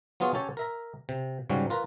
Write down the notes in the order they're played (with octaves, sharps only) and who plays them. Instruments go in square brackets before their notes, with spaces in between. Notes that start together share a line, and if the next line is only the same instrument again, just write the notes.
[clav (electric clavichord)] F#3 B3 F4 G#4 C#5
C#4 G4 A4 C#5
A#4 E5 A#5
C3
G#2 C#3 F#3 G3 C#4
F4 A#4 B4